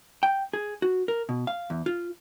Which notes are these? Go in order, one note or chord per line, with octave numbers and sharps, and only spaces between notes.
G5
G#4
F#4
A#4
B2
F5
E2
F4